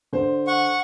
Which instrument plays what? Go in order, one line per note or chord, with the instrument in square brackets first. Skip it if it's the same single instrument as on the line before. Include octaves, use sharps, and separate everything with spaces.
[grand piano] D3 C5
[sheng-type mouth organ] F#5 C#6